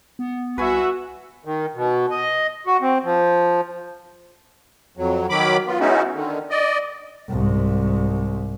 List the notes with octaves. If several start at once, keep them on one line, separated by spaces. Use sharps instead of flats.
B3
C2 F#4 B4 E5 G#5
D#3
B2
D#5
F#4
C4
F3
F2 F#3
D#3 F#3 B5 D6
B3 F4
G#3 B3 C#4 D#4 E4 F#4
D3 D#3
D5 D#5
C2 G#2